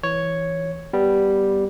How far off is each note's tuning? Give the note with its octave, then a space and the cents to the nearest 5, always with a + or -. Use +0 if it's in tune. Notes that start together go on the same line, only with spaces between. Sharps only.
E3 +0 C#5 +0
G3 +0 B3 +0